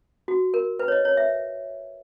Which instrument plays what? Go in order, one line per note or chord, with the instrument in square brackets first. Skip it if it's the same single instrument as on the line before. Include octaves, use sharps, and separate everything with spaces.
[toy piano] F#4
A#4
B4
C#5
D#5
C#5
E5